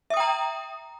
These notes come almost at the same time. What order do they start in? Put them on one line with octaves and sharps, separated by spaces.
E5 D#6 G5 A#5